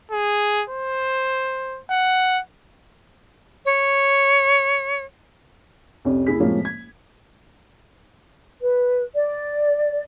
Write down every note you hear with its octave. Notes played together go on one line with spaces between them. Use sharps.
G#4
C5
F#5
C#5
C2 F2 C#4 G4
F#1 E4 G#4 B6
A2 C3 F3 G#3 A#3 C#4
G#6
B4
D5